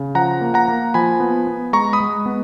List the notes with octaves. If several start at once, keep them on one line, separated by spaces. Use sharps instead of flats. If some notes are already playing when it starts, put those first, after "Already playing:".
Already playing: C#3
F3 F#5 A#5
A#3
F#5 A#5
A#3
F3 G#5 B5
B3
B3
G#3 A#5 C#6
B5 D#6
G#3
B3